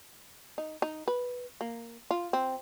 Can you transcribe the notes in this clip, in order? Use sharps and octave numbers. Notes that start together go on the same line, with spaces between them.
D#4
D#4
B4
A#3
F4
C4